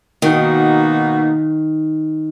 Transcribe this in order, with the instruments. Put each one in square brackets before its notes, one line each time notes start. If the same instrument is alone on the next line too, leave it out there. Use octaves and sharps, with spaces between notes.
[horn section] B2 A#3 D#4 F#4 [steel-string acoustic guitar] D#3